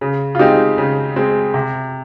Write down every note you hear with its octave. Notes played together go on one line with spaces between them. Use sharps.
C#3
F4
G#3 C4 D#4 G4
C#3
G#3 C4
C3